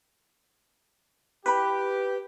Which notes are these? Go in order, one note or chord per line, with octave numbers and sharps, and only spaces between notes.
E4 G4 B4 B5